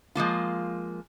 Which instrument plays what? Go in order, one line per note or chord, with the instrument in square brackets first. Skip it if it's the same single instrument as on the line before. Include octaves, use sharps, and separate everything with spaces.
[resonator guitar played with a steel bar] F3 G#3 A#3 F4